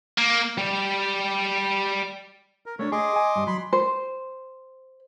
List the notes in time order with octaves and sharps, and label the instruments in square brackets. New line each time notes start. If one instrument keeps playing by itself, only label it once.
[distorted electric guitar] A#3
[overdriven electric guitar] G3 G4
[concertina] A#4
[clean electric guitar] A3 B3 D4 [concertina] C#5
[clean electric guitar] G#4 [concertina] D#5 C6 D6
[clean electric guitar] G#5
G2 G3
[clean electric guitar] F#3 [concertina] B5 C6
[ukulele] C5